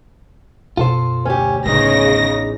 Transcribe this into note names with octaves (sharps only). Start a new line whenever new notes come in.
F#2 B2 F4 A4 C5
D2 C#4 G4
A1 E2 C#3 C4 D#4 A#6